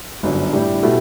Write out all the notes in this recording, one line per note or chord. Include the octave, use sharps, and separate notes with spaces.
G1 F#2 D3
A2 G3 D4 G4
B2 A3 E4 G4